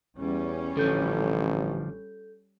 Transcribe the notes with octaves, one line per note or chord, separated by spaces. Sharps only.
E2 G3 C#4
A1 D3 F3 A4 G6